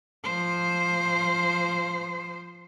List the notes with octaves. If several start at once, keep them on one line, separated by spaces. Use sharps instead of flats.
F3 C5